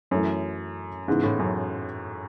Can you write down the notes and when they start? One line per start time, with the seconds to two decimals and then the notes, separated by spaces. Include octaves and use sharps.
0.11 F#2 E3 A3 E4 A4 C#5
1.08 G#2 C#3 E3 B3
1.24 A2
1.39 F#2